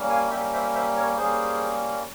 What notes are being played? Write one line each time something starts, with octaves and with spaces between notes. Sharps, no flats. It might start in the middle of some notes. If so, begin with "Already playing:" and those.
Already playing: G3 A#3 C#4
F5 G#5
G3 A#3 C#4 E5 G5
C5 E5
C5 E5
A#4 C#5
G3 A#3 C#4 G#4 C5